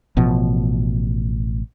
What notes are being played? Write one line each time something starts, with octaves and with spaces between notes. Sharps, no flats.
A1 B2 F3